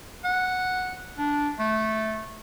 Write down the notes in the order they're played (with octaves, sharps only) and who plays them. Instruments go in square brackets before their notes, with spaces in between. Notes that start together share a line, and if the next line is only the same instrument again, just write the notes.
[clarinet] F#5
D4
A3